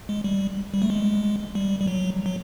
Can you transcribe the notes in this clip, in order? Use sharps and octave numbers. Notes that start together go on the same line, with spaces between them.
G#3
G3
G3
A3
G#3
G3
G3
F#3
F#3